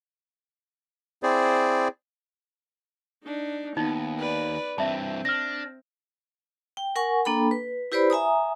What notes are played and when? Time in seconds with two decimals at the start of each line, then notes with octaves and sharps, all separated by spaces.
1.23 C4 E4 G#4 C5 D5
3.24 D4 D#4
3.77 D#2 B3 D#4
4.19 B4 D5
4.78 G2 E3 C4 E5 A5
5.25 D4 F6 A#6
6.77 G5
6.96 A#4 F#5 G#5 C#6
7.25 A#3 D4 A4 G5 B5
7.51 B4
7.92 E4 G4 B4 C5 D5 B5
8.10 E5 G#5 A#5 D#6